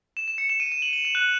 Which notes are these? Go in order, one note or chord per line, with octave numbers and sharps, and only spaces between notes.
E7
E7
C#7
E7
D#7
E7
F#7
F#7
E7
F#6